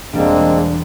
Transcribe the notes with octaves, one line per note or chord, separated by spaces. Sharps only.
E1 G3 G#3 A#3 C4 D4